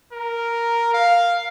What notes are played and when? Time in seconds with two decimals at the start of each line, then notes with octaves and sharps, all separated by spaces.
0.13 A#4
0.94 F5